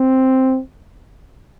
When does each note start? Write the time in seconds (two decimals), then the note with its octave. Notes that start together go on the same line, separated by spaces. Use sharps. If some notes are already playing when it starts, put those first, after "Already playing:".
Already playing: C4